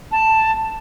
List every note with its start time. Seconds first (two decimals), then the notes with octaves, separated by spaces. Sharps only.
0.12 A5